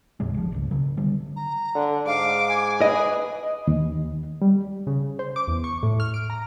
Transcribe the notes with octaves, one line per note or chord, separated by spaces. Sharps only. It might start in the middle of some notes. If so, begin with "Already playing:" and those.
D2 G#2 C3 G#3
G1 F3
G#1 C#2
C#3 F#3
D3 G3
A#5
D3
G#2 F5 D6
G#5
G#4 B4 D#5
D#5
D#2
G3
C#3
C5
D6
E2
C#6
A2
F6
D7
A#5